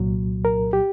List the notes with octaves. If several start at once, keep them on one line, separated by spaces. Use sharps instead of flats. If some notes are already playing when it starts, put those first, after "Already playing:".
Already playing: C2 A#2 F#3
A#4
G4